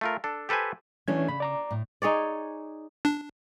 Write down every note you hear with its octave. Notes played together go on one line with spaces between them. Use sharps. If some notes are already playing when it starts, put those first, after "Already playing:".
A3 F4 A#4
D4 A4
G4 A4 B4 C5 G#5
E3 A3 C#4 D4 G#6
C#3 B5
D5 A#5 D6
A2
D#4 G#4 C#5 D5
D4